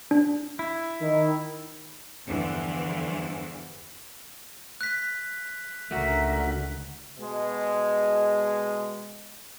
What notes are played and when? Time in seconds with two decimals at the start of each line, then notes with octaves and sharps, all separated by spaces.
0.11 D4
0.59 E4
1.00 D#3
2.25 E2 G2 D3 E3 F3
4.81 F#6 B6
5.91 C#2 D3 A3 F#4 A#4 E5
7.19 B2 G#3